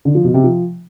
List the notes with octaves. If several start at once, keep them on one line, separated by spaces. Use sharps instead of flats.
D3
F3
B2
C3
F3